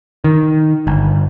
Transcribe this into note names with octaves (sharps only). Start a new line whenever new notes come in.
D#3
G1